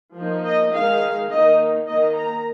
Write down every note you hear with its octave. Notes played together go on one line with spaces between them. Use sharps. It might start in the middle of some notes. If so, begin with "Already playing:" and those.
F3 A#3 D#4
D#5
D#3 G#3 D#4 F5
D#3 A#3 D#4 D#5
D#3 A#3 D#4 D#5
A#5